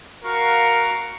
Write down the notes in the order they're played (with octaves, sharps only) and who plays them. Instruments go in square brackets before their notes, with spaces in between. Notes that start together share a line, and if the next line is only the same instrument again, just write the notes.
[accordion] F#4 F5 C#6 [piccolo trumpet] A#4